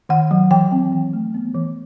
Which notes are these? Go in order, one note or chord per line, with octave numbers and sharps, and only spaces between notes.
D#3 F#5
F#3
E3 G5
C4
E3
A3
B3
E3